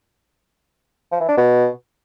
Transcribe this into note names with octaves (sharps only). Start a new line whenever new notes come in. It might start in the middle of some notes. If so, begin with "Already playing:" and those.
F3
E3
D4
B2